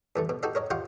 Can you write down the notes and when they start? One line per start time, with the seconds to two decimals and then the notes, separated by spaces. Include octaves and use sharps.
0.16 G2 E3 A3
0.29 B2
0.43 D#4 F#4 G4 A4 D#5
0.55 A#4 C#5 D#5
0.70 F4 G4 D#5 F5 F#5 C#6